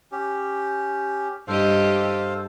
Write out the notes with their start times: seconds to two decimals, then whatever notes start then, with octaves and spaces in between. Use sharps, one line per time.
0.12 C#4 G4
1.48 G2 G4 A4 C5 D#5 F5